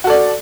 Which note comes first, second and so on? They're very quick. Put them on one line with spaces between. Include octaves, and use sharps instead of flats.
F#4 A4 D5